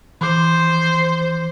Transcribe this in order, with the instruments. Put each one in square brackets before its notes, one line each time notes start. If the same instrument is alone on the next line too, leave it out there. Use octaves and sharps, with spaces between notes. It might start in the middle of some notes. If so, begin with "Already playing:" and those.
[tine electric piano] E3 C6 D6 [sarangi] C5